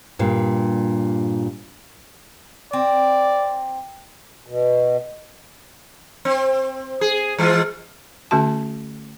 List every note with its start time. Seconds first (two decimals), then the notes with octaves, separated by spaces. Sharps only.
0.19 G2 A#2
2.73 C4 D5
4.47 B2
6.25 C4
7.01 G#4
7.38 E3 G#3 F4
8.31 D3 A3 C#4 F#4 A5